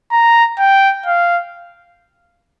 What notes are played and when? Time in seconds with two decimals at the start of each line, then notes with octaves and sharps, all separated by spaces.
0.12 A#5
0.59 G5
1.06 F5